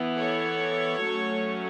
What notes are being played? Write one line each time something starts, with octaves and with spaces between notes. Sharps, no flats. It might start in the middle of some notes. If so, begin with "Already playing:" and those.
Already playing: E3 B3
A4 C#5
F#3 A3 C#4